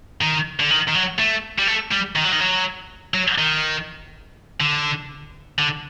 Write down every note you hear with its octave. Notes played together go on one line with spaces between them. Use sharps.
D#3
D3
D#3
D#3
F#3
A3
G3
A3
G3
D#3
F#3
D#3
F#3
F#3
D#3
D3
D3